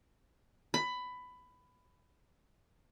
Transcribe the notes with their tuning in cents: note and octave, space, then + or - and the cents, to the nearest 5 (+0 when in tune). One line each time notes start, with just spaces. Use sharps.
B5 +15